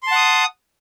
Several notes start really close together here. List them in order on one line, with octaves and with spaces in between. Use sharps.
C6 A5 F#5 D#6